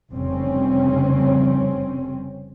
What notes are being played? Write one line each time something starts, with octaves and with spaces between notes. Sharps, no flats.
F1 F2 C#3 G3 C4 C#4